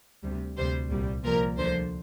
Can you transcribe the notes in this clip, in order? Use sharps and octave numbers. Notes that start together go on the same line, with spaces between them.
D2 C3 G3
D2 C3 G3 C5
C2 A#2 G3
C2 A#2 F3 A#4
D2 D3 F3 C5